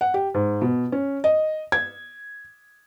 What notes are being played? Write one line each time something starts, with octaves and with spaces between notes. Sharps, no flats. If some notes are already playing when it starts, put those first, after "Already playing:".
F#5
G4
G#2
B2
C#4
D#5
G#6